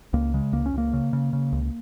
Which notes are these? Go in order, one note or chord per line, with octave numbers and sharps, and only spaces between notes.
C#2 A#3
C#3 G#3
C#2 A#3
C#4
C#2 A#3
C#3
C#3
C#3
C#2